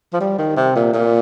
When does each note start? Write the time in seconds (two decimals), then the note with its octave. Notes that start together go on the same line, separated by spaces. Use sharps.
0.13 F3
0.21 G3
0.38 D#3
0.56 C3
0.76 A#2
0.94 A#2